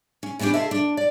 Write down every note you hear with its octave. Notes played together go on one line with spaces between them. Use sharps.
C#4
E3 B3 C#4 D4 G4
F4 F#4 G#4 A4 D#5 E5
D4
D5